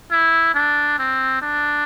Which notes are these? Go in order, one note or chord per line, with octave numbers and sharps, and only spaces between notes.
E4
D4
C4
D4